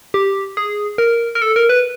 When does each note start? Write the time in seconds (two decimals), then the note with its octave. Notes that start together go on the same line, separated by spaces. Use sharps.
0.14 G4
0.57 G#4
0.98 A#4
1.35 A#4
1.42 A4
1.56 A#4
1.69 B4